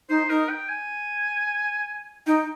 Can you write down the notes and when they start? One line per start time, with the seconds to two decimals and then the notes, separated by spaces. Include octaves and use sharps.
0.09 D#4 C5
0.30 D#4 A#4
0.49 G5
0.69 G#5
2.27 D#4 G5